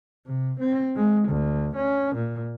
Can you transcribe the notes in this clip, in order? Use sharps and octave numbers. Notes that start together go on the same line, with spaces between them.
C3
C4
G#3
D2
C#4
A#2